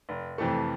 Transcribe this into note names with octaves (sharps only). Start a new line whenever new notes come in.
F1
F2 C3 E3 A3